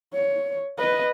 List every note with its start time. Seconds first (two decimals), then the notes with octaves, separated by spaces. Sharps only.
0.13 C#5
0.78 B4 D#5